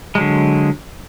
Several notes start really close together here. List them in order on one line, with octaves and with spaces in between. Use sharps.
G#3 F#3 D3